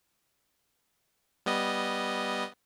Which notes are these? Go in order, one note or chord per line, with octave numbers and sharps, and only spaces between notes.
G3 B3 D#5